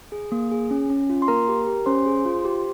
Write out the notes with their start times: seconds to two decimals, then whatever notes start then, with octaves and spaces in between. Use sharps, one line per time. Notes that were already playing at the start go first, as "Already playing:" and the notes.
0.12 G#4
0.32 A#3
0.52 G#4
0.71 C#4
0.90 C#4
1.10 F4
1.22 C6
1.28 A#3 A#4 A#5
1.48 G4
1.67 G4
1.86 C#4 C5 C6
2.06 G#4
2.25 F4
2.45 G4